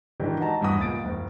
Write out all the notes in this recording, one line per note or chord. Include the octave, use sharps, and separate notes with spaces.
G#2 D#3 E3 F#3 D4 G4
F#4 D#5 A5 A#5
E2 G2 F#4 D#6
C#2 A#2 F5 A6 D7
F#1